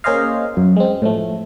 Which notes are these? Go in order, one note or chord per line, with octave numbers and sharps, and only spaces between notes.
A#3 C#4 G#4 C5 D#5 F5
F#2
G#3 C4
A2 F3 A3